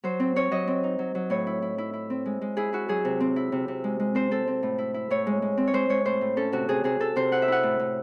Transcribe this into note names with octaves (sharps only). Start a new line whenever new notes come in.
F#3 C5
C4
C4 C#5
F#3 D#5
C4
D#4
F#3
F#3
A2 C#5
E4
E4
E4
E4
C4
G#3
G#3
E4 G#4
E4 F#4
F#3 G#4
C3
C4
E4
C3
C3
G#3
G#3
C4 C5
C4 A4
C4
A2
E4
E4
A2 C#5
G#3
G#3
C4
C#5
G#3 C5
G#3 C#5
A2 C5
A2
C#4 A4
C3 F#4
C3 G#4
C3 G#4
C3 A4
C3 C5
E4 F#5
E5
E4 F#5
A2
A2